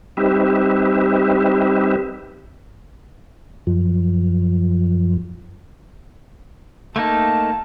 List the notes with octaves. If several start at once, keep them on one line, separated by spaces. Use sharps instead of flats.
G3 C4 D#4 G4 B4 E5
F#2 F3
A3 A#3 D#4 A5